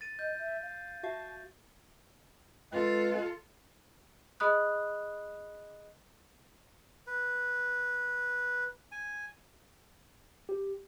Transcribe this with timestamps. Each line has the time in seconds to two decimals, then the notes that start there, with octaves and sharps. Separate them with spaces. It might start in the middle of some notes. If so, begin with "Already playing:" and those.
0.01 A6 D#7
0.19 D#5 G6
0.39 E5
0.62 F5
1.03 F#4 E5 F5 A5
2.72 G#3 C4 F4 A4 B4
4.40 G#4 D#5 B5 D#6 F#6
7.07 B4
8.92 G#5
10.49 G4